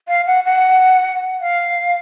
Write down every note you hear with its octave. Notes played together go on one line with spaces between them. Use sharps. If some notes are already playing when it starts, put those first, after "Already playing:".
F5
F#5
F#5
F5